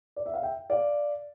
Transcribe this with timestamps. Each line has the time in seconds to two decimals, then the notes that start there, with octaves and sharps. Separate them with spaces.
0.16 D5
0.26 E5
0.34 F5
0.42 E5 G5
0.70 D5 F5